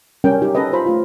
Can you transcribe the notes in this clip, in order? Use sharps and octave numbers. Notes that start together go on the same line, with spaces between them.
G3 C#4 A#4 G5
D#4 G4
C#4 G4 A4 B4 D#5
F4 C5 A#5 B5
A3 F4